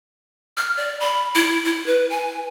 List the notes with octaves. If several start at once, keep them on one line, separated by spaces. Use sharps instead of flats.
F6
D5
B5
E4
E4
B4
G#5